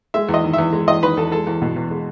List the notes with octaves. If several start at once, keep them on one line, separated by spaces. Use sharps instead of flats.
G#3 E5
E2
D#5
D#3
E2 E5
G#3
E2 D#5
D#3 B4
E2 A4
G#3 A4
E2
B2
E2
G#3